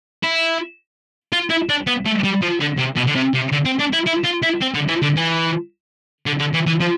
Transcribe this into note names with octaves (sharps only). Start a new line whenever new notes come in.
E4
F4
E4
D4
B3
A3
G3
F3
D3
C3
B2
D3
C3
C3
D3
C4
D4
E4
E4
F4
E4
C4
D3
E3
D3
E3
D3
D3
E3
E3
F3